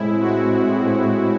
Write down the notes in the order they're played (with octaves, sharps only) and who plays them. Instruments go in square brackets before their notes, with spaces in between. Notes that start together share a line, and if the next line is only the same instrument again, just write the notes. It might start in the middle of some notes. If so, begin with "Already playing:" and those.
Already playing: [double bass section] A2 G#3 C4 [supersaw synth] E4
[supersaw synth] F#4